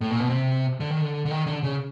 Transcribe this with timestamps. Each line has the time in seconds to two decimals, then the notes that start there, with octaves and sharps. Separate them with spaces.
0.01 A2
0.11 A#2
0.21 B2
0.30 C3
0.80 D3
0.90 D#3
1.01 D3
1.25 D3
1.31 D#3
1.47 D3
1.63 C#3